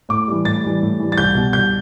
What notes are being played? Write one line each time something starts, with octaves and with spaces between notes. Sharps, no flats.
A2 D6
E3 G3
A2 A6
E3 G3
A2
E3 G3
A6
C2 G6
B2 G3
C2 G6